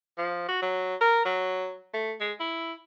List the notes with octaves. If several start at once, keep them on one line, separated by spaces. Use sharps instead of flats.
F3
F#4
F#3
A#4
F#3
A3
G#3
E4